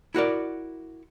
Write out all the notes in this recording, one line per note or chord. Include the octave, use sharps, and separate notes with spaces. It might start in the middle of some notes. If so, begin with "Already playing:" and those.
E4 F#4 A#4 D5